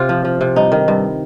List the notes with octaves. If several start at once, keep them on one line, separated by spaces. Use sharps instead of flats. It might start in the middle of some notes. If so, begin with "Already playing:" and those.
Already playing: C3 F4
F3
F3
C3
G2 D#4
D#3
G2